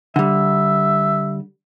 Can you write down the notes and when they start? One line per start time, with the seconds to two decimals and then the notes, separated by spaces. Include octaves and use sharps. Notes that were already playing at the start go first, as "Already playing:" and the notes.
0.16 D3 G3 E5